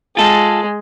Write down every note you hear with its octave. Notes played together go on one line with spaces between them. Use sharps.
G#3 F4 A4